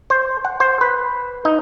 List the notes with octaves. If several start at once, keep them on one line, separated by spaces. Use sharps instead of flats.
C5
F#5
C5
B4
D#4